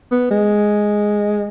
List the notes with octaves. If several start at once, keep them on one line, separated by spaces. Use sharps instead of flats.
B3
G#3